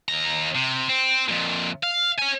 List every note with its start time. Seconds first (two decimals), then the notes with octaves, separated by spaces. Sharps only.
0.08 D#2 A#5
0.55 C3
0.89 C4
1.29 F2 A#2
1.83 F5
2.18 C#5 G#5